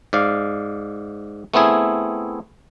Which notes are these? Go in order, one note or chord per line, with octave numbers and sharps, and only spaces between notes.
G#2 D5 F5
A3 B3 C4 E4 G#4